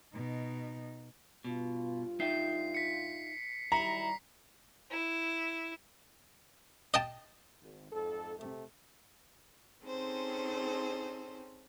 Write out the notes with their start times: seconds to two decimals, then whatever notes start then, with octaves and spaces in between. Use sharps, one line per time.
0.15 B2 D#4
1.45 G2 B2 F4
2.20 D#4 E5 G5 C7
2.74 B6 C#7
3.72 D#3 F#3 G3 E4 A#5 B6 C#7
4.91 E4
6.94 D#5 G5 A5
7.61 G#1
7.92 F2 G#2 A4
8.38 C3 A3
9.84 C4 C#4 D#4 G#4 A4 C5